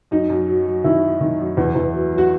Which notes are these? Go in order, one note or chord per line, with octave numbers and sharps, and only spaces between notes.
F#2 D#4
F#2
F#3
F#3
D#3 E4
F#3
D#3
F#2
E2
E2
F#3
F#3
F#4